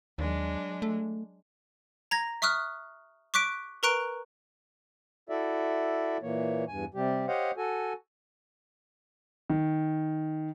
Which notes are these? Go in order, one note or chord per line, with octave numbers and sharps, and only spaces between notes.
D#2 F#3 G#3 D4
A3
A#5 G#6 A#6
E5 C#6 D#6 F6 F#6
C#6 D6 F#6 B6 D7
A#4 B4 A#5 C#6 F#6 D7
E4 F#4 A4 D5 E5
A#2 E3 A#3 C#5
E2 G2 G#5
C3 G3 G4
G4 C5 C#5 D#5 F5 F#5
F#4 A4 G#5
D#3